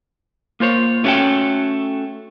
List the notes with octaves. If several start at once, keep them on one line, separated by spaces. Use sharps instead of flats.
A#3 F4 C5 C#5
A3 C#4 F#4 G4 A4 G5